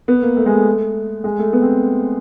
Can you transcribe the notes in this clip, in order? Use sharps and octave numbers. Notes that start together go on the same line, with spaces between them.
B3
A#3
A3
G#3
A3
G#3
A3
B3
C4